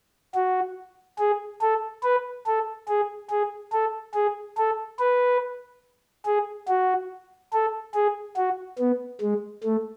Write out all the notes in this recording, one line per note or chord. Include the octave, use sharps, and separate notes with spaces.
F#4
G#4
A4
B4
A4
G#4
G#4
A4
G#4
A4
B4
G#4
F#4
A4
G#4
F#4
B3
G#3
A3